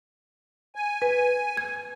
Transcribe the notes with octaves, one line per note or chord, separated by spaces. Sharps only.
G#5
B4
G#6